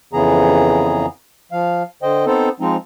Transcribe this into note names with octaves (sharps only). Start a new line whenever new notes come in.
F2 C#3 E3 B3 G#4 A#5
F3 F5
D3 C5 D#5 G5
B3 C4 D#4 A4 C5
F3 G#3 C4 D#4